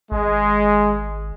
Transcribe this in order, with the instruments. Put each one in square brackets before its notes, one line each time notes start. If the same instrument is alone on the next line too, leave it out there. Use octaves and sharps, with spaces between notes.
[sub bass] G#1 [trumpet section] G#3